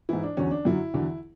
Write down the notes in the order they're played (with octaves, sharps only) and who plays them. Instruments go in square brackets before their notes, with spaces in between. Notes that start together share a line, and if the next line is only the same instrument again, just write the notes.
[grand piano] G#2 E3 E4
D4
E2 D3 F#3 C#4
D4
F#2 D3 F#3 E4
E2 D3 F#3